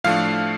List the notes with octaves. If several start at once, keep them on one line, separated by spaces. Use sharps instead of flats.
A2 F3 A3 D4 F5